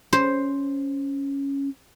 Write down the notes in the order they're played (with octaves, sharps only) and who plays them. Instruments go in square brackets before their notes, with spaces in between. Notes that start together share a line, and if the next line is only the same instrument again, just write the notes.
[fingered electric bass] C#4 [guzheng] C5